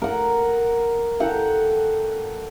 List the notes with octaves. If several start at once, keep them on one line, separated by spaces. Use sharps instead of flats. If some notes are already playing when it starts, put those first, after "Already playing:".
A#4 F#5
A4 F#5 G5 A#5